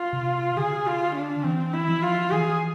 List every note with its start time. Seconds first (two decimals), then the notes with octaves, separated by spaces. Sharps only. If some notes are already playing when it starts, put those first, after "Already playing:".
Already playing: F4
0.13 C3
0.57 D3 G#4
0.87 F4
1.15 D4
1.44 E3 C4
1.74 E4
1.88 F3
2.03 F4
2.32 E3 G#4